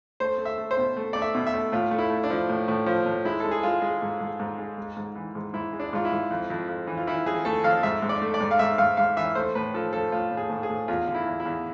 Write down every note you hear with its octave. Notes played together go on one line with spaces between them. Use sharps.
A3 C5
A3
E5
A3
C5
B2
A3
A3 D5
E5
B2
E5
A3
A2 F4
A3
E4
A3
D4
F3
A2
A2
F3
A2
G#3 E4
G#3 A4
G#4
G#3 F4
G#3
G#2
G#2
G#2
G#3
G#3
G#2
E3
G#2
G#2 E4
G#3
D4
G#2 F4
E4
G#2
F2
F2
F2
E3
F4
E3 E4
F2 G#4
A3 A4
F2 F5
G#2 E5
G#2
D5
A3
D5
G#2
F5
G#2 E5
G#2 F5
G#2 F5
E3 E5
A3 C5
A2 B4
F3 A4
F3 A4
A2 F4
A2
G#4
A2
G#4
A2
E2 F4
D3
E4
E2
E4
E2